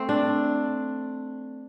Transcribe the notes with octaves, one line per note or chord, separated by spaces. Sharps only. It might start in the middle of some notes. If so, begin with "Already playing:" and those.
Already playing: A3 C4
D4